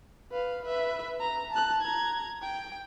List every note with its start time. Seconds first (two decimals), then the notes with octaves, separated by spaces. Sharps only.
0.31 B4 F5
0.63 B4 E5
1.20 A#5
1.52 A5 F#6
1.82 A#5 G#6
2.42 G5